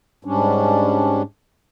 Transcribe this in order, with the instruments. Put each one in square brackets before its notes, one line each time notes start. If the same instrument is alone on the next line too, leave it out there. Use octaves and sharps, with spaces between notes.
[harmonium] G#2 G3 C#4 D4